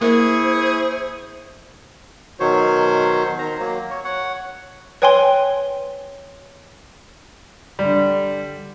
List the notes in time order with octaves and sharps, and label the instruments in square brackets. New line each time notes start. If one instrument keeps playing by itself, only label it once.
[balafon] A#3 A#4 [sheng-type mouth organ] E4 C#6 [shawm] G#4 [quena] C5
[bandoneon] B2 D#3 F#3 C5 C#5
D#3 C5 A#5
F#3 A#3
C#5
C#5 F#5
[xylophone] B4 C#5 G5 G#5 C6 G7
[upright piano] D3 G3